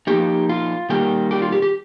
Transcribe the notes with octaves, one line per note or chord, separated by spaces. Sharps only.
F3 A#3 D#4 G4
F4
D#3 G3 A#3 G4
G4
F4
G4
G4